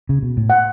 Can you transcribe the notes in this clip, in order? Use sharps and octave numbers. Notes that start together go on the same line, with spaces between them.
C#3
B2
A2
F#5